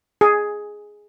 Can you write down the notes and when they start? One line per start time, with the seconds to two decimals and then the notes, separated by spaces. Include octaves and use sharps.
0.21 G#4